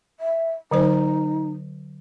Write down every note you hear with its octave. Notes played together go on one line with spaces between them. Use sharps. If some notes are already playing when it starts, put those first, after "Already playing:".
E5
D3 F#3 D#4 C5